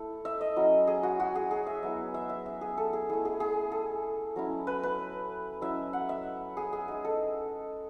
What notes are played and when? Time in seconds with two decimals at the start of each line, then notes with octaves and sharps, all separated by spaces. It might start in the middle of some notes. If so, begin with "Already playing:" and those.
Already playing: A3 E4 A4
0.25 E5
0.41 D#5
0.56 F#3 C#4 E4
0.87 G#4
1.03 F#4
1.20 F#4
1.35 G#4
1.51 G#4
1.67 E5
1.82 F#3 B3 E4 E5
2.14 E5
2.29 E5
2.46 E5
2.61 G#4
2.78 A4
2.93 G#4
3.10 A3 E4 G#4
3.25 G#4
3.40 G#4
3.72 A4
4.36 F#3 C#4 E4
4.67 B4
4.83 B4
5.61 F#3 C#4 E4 E5
5.93 F#5
6.09 E5
6.57 G#4
6.73 G#4
6.88 G#3 D#4 G#4
7.05 A4